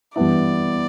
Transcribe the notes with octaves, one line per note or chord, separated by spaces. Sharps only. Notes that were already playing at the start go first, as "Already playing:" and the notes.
G2 E3 B3 E4 D5